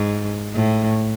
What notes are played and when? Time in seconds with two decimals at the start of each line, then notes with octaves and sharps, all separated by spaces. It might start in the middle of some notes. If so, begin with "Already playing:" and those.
Already playing: G#2
0.54 A2